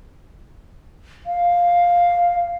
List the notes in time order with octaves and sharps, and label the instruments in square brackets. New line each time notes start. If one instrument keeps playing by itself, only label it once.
[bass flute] F5